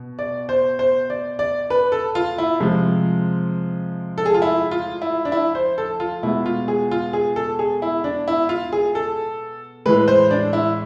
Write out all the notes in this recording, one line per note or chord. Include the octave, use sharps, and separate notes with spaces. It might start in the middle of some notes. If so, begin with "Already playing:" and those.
Already playing: B2
D5
C5
C5
D5
D5
B4
A4
F4
E4
C3 F3 G#3
A4
G#4
F4
E4
F4
E4
D4
E4
C5
A4
F4
B2 G#3 E4
F4
G#4
F4
G#4
A4
G#4
E4
D4
E4
F4
G#4
A4
A2 E3 G#3 B4
C5
D4
E4